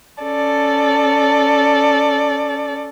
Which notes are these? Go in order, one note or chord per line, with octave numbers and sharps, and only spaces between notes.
C#4 A4 D5